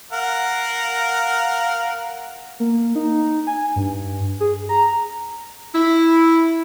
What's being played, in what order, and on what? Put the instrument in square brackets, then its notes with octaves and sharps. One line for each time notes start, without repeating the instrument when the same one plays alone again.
[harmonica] A#4 F5 F#5
[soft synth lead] A#3
D#4
G#5
G2
G#4
A#5
[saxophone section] E4